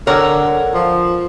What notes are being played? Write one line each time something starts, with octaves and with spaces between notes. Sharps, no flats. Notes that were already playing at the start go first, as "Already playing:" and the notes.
D3 A#4 C#5 F#5
F3